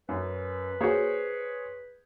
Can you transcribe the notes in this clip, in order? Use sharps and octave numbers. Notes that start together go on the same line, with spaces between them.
F#2 B4
A#3 F#4 G#4 C5 C#5